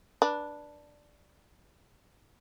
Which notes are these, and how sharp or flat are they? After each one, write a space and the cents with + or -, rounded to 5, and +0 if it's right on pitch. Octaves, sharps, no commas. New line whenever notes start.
D4 +5 B4 -25